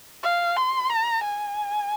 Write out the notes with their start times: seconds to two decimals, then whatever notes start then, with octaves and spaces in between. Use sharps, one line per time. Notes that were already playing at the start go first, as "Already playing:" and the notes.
0.23 F5
0.57 C6
0.90 A#5
1.24 G#5